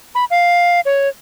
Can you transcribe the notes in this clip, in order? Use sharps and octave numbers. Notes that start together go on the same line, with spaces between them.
B5
F5
C#5